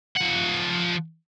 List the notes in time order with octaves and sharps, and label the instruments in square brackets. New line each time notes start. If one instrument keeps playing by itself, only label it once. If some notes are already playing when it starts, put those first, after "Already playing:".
[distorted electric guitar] F3 F#5